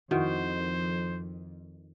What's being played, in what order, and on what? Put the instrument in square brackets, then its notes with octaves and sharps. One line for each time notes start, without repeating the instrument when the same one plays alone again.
[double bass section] F2 [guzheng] D#3 [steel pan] E4 F#4 A#4 [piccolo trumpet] C5